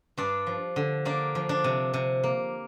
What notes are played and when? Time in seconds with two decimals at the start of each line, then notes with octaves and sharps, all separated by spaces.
0.17 G2 D4 D5
0.47 F3
0.76 D3
1.05 A#3 D4 D5
1.35 F3
1.49 D4 D5
1.64 C3
1.94 C3
2.24 A#3